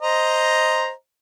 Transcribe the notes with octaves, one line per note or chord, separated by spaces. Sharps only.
C5 D#5 A#5